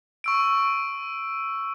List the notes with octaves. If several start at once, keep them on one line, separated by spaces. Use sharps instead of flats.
C#6 E6 D7